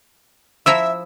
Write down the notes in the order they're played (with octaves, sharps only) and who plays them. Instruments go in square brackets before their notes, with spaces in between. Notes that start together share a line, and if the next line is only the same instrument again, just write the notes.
[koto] F3 E4 A#5 [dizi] E5 [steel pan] E6